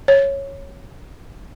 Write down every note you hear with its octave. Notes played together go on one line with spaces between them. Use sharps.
C#5